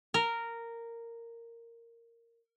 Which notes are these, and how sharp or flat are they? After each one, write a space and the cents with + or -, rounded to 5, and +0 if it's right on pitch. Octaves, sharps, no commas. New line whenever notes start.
A#4 -10